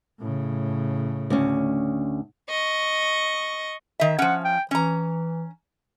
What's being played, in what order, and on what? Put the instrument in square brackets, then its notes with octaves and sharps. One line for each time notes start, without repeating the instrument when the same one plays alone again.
[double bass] A2 C#3
[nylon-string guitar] D2 C#4
[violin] D#5 C#6
[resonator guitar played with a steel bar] D#3 E5
[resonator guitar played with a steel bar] F3 C#4 [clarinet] F#5
[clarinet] G5
[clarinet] E3 [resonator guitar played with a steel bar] C#4 A#5